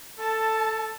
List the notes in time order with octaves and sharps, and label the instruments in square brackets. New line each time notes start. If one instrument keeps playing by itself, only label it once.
[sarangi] A4 [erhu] A5